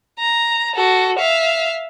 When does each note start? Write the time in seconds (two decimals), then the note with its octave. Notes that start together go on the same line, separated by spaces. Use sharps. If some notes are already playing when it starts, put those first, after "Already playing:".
0.19 A#5
0.75 F#4 A4
1.19 E5 F5